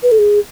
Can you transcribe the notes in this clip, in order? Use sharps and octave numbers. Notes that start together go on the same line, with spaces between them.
B4
A4
G#4